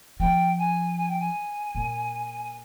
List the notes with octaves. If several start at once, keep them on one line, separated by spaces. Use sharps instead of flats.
F3 G5
G#5
G#5
G5
G#5
A#2